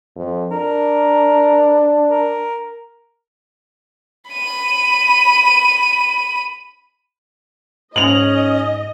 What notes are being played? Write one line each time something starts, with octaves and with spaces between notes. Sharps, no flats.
F2
D4 A#4
A#4
B5 D#7
G#2 C#4 D#5 F7 F#7